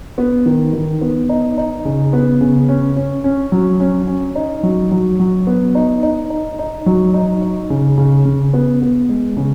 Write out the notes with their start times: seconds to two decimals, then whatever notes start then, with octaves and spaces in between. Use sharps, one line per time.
0.18 B3
0.46 D#3
0.73 D#3
1.01 B3
1.29 D#4
1.58 D#4
1.85 C#3
2.13 B3
2.41 C#3
2.69 C#4
2.97 C#4
3.24 C#4
3.52 F#3
3.80 C#4
4.08 C#4
4.36 D#4
4.63 F#3
4.91 F#3
5.20 F#3
5.47 B3
5.75 D#4
6.03 D#4
6.30 D#4
6.59 D#4
6.86 F#3
7.14 D#4
7.42 D#4
7.70 C#3
7.98 C#3
8.25 C#3
8.53 B3
8.81 B3
9.09 G#3
9.37 C#3